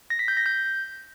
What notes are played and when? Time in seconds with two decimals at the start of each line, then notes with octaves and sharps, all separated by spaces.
0.10 A#6
0.19 B6
0.28 G6
0.37 A#6
0.46 G6